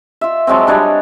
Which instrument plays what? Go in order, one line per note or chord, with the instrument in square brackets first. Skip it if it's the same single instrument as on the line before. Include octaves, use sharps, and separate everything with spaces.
[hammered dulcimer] F4 E5
F3 F#3 G#3 C4
G3 D4 C#5 D#5